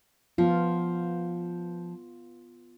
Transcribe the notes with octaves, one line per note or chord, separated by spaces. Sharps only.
F3 B3 F4